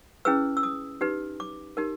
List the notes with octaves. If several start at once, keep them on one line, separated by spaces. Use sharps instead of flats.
C#4 E4 G#4 B4 E6
E6
D#6
D#4 G4 B4
D6
D#4 G4 A#4